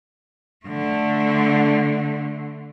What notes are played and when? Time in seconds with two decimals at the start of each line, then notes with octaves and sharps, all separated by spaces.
0.66 D3 A3